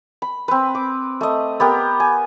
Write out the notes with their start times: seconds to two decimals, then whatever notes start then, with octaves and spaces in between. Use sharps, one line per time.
0.22 B5
0.48 C4 B4
0.75 D6
1.21 A3 D#5
1.60 B3 G4 A#4
2.00 G#5